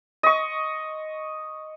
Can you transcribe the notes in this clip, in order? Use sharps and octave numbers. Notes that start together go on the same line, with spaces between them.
D#5 C#6